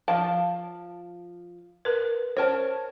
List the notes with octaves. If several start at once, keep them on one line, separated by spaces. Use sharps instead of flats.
F3 F5 A5
A#4 B4
C#4 A#4 C5 A5